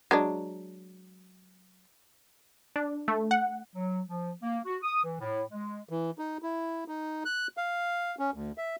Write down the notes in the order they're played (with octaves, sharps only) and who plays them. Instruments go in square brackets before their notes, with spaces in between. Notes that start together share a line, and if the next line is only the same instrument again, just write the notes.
[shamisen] F#3 G#3 D4
[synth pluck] D4
A3
F#5
[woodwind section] F#3
F3
A#3
F#4
D#6
E3
A2
G#3
[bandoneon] E3
D#4
E4
D#4
F#6
F5
C#4
D2
E5